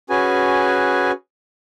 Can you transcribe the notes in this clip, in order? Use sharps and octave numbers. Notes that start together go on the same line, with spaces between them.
C#4 F#4 G#4 B4 G#5